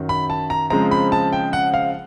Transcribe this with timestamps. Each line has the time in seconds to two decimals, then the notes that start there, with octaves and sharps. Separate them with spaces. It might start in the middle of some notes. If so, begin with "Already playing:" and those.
Already playing: F#2 D#3 F#3
0.09 B5
0.30 A5
0.50 A#5
0.70 C#3 F3 G#3 C4 A#5
0.91 B5
1.12 A5
1.33 G5
1.53 F#5
1.74 F5